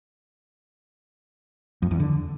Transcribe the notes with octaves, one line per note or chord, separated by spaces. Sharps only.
F2
E2
D3